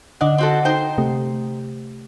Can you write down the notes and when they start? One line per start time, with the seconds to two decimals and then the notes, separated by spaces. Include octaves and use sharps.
0.21 D3 D4 D#5 F#5
0.38 C4 F#4 A4
0.65 D#4 C5 G5
0.98 C3 A3 G4